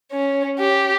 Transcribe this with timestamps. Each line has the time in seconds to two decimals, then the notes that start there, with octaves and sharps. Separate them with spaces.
0.12 C#4
0.59 G4